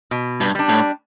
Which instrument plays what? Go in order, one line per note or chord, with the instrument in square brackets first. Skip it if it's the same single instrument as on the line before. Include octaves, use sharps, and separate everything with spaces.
[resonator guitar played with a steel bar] B2
[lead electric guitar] G2
[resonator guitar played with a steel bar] G3 D4
[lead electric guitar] A2